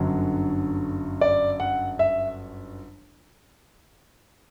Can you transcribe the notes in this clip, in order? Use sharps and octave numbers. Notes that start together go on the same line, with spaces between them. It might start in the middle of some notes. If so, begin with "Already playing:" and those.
Already playing: G1 F#2 D3 F#3
D5
F#5
E5